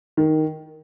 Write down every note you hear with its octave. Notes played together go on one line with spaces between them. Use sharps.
D#3